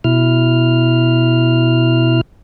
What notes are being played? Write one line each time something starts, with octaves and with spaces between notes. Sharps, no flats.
B2 E4 F6